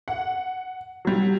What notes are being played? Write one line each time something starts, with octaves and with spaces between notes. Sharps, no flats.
F#5
F#3 G3